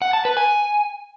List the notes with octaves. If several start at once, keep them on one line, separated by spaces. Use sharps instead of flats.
F#5
A5
B4
G#5